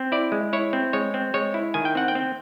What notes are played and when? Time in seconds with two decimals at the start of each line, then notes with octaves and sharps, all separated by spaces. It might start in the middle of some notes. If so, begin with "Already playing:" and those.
Already playing: C4
0.12 E4 D5
0.32 G#3
0.53 E4 C#5
0.73 C4
0.93 G#3 C#5
1.14 C4
1.34 G#3 C#5
1.54 E4
1.74 D#3 G#5
1.85 G5
1.95 C4 F#5
2.08 G5
2.15 C4